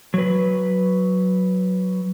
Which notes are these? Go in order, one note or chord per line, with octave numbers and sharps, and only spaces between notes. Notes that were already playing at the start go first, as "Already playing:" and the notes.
F#3 B4